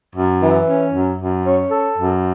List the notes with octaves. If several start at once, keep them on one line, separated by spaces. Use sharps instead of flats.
F#2
E3
C#4
F#2
F#2
C#4
A4
F#2